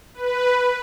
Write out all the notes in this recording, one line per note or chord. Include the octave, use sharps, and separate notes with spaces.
B4